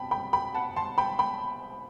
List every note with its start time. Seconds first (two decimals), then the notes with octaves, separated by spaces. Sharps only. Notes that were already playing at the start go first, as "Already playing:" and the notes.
Already playing: B2 C4 G5 A5 B5
0.11 G5 B5
0.33 G5 B5
0.55 F#5 A5
0.76 A5 C6
0.98 G5 B5
1.19 G5 B5